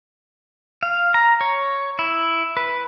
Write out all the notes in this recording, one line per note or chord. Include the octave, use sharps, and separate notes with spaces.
F5
A#5
C#5
E4
B4